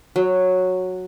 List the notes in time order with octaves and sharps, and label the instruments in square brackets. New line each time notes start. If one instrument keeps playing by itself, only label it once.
[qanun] F#3